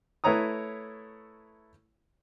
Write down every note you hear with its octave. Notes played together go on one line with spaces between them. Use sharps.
A3 E4 B4 C#5 A#5 D#6